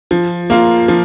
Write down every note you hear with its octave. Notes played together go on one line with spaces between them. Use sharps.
F3
A#3 F4
F3